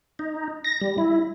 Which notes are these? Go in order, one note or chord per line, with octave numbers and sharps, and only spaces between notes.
D#4
A#6
G3
E4